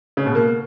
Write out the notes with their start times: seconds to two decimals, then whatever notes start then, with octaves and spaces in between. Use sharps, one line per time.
0.17 C#3
0.26 B2
0.35 A#3